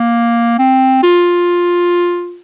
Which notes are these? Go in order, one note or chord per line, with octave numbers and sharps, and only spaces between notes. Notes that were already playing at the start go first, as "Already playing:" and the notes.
Already playing: A#3
C4
F4